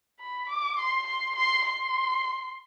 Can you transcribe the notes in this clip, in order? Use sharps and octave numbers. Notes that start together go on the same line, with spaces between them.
B5
D6
C6
C6
C6
C6